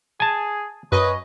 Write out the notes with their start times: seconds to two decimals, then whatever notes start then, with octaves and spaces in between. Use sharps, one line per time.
0.20 G#4 G#5 A5
0.92 F#2 B4 C#5 D#5